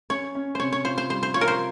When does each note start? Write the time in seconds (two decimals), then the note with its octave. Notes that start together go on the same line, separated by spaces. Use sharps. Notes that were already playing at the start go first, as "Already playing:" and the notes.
0.10 C#4 C#5
0.35 C#4
0.55 C3 C5 C#5
0.72 C#5
0.85 F4 C5
0.98 C5
1.10 G3 C5
1.23 C5
1.34 F4 C#5
1.41 A#4
1.47 C5